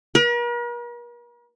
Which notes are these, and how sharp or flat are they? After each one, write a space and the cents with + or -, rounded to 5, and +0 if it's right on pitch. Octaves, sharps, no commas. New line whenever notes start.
A#4 +45